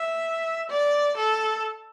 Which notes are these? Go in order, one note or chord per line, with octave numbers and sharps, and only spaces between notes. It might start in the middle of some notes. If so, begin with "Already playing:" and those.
Already playing: E5
D5
A4